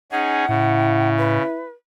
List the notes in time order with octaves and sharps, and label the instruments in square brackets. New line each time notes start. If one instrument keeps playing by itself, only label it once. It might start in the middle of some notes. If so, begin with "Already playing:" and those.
[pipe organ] C#4 D#4 G#4 [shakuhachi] F#5
[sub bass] A2 [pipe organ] C#3 [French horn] E4
[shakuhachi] B4